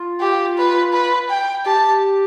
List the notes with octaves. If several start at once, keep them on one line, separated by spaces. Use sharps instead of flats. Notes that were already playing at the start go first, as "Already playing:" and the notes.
Already playing: F4
G4
B4
B4
G5
G4 A5